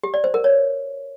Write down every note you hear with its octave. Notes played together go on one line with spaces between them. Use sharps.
G4
D5
C5
A#4
C#5